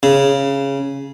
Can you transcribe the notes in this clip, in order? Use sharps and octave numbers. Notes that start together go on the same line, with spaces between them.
C#3